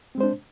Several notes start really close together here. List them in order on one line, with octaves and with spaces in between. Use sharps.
C4 G#3 C5 D4